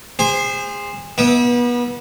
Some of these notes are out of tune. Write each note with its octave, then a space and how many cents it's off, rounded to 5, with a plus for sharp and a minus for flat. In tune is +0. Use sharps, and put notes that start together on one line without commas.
G#4 -30 C5 +0
B3 -30 E4 -40